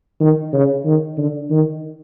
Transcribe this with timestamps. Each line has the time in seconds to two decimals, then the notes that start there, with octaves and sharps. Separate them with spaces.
0.20 D#3
0.53 C#3
0.85 D#3
1.17 D3
1.50 D#3